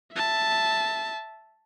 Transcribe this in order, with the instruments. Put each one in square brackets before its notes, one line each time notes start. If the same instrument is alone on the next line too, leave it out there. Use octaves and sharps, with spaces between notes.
[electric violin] E5 A5